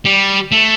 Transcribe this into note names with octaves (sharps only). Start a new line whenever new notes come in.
G3
A3